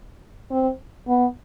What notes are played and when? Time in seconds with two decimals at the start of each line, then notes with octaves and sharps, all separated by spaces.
0.51 C4
1.08 B3